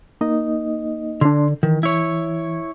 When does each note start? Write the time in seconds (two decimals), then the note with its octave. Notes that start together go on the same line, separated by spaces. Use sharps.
0.21 A#3 D#4 D#5
1.21 D3 D4 C6
1.63 D#3 E3
1.83 E4 C#5